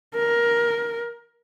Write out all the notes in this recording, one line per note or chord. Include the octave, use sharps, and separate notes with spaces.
A#4